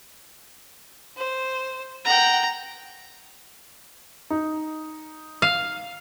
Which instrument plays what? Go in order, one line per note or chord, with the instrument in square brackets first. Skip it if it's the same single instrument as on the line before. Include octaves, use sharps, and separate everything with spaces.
[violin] C5
[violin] F#5 G5 [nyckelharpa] A#5
[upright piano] D#4
[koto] F5